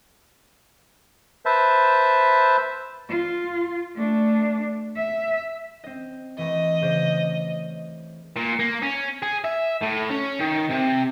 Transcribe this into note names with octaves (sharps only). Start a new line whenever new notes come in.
B4 C5 E5 A5
F4
A3 D4
E5
C4 D#5
E3 A3 D#5
C#3 C5 D5
A#2
A#3
C#4
G#4
E5
A2
C#4
D#3
C3